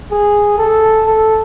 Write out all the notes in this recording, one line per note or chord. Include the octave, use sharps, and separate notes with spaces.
G#4
A4
A4